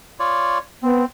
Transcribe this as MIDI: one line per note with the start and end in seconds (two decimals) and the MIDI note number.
0.19 0.58 65
0.19 0.58 73
0.19 0.58 74
0.83 1.03 59
0.83 1.05 60